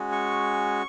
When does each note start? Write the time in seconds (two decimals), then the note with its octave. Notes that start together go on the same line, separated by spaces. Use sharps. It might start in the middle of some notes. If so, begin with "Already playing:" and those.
Already playing: G#3 C#4 F#4
0.12 C#6